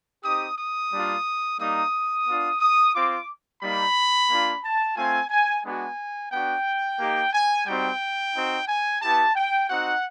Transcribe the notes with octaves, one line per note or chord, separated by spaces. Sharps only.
C4 D#4 G4 D#6
D#6
G3 A#3 D4 F4
G3 A#3 D#4 D#6
B3 D4 F4
D#6
C4 F4 D6
G3 A#3 D#4 B5
A#3 D4 F4
A5
A3 C4 F4 G#5
G#5
G#3 B3 D4 F#4 G#5
B3 D4 F#4 G5
A#3 D#4 G4
G#5
G3 C4 D#4 F#4 G5
C4 D#4 F#4
G#5
B3 E4 G4 A5
G5
C4 D#4 F#4 F#5